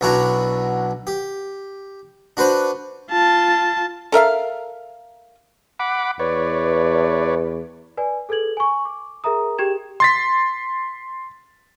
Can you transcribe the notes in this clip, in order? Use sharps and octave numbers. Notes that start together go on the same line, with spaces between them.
B1 B2 D4 E4 F#4 A#5
G4
D4 F#4 B4 C5
F4 A5
A4 A#4 E5 F5
F#5 B5 D6
E2 B4 C#5 D5
B4 D5 G#5
G#4 A4 B4 G#6 F#7
G#5 C#6
D6
G#4 A#4 E5 A#5 D#6
G4 G#4 G5 G#6 E7 F7
C6 A6 B6